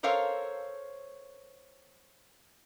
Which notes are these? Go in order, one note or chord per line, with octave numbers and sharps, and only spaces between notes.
A4 A#4 C5 C#5 F5